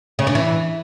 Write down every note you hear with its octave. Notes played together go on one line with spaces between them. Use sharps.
C#3
D4
E3